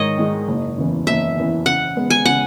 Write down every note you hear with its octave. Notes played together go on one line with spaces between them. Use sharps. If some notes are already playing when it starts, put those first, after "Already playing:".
Already playing: G#2 D#3 G#3 D#4 C#5 D#5
D#3 G#3 D#4
F#1
E2 C#3 E3
F#1 E5
E2 C#3 E3
C#3 F#5
G#3 B3
G#5
C#3 F#5